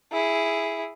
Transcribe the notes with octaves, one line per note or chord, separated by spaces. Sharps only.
E4 G#4